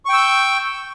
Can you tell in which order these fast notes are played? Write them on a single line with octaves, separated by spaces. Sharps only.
C#6 G5 E6 G6